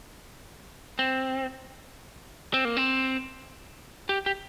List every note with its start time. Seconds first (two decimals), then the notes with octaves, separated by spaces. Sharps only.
0.99 C4
2.54 C4
2.65 A#3
2.77 C4
4.09 G4
4.26 G4